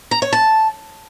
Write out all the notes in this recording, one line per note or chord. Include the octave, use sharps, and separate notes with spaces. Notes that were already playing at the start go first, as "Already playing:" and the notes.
A#5
C#5
A5